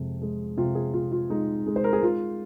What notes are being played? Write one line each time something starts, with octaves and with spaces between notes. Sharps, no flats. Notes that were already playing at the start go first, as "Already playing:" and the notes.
Already playing: F2 C3 G#3
G#3
C3 F4
G#4
C3 F4
F4
G#3 D#4
G#3
C5
A#4
G#4
G#3 F4